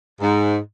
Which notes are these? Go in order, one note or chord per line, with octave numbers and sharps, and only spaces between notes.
G#2